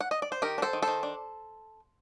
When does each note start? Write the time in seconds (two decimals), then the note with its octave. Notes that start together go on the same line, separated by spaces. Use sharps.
0.01 F#5
0.11 D#5
0.22 D5
0.32 C5
0.42 D#3 G4 A#4
0.58 D4
0.62 A4 C5
0.73 D#3
0.82 A4 C5
0.88 D#3
1.03 D4